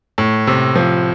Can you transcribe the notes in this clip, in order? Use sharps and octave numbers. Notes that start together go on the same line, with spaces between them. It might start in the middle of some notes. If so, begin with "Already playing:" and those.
A2
C3
F3